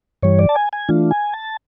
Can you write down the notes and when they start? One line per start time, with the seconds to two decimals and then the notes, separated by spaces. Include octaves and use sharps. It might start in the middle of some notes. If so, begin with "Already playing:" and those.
0.23 G2 E3 G3 C#5
0.39 D5
0.49 A5
0.55 G#5
0.73 G#5
0.89 E3 A3 D4 F4
1.11 G#5
1.33 A5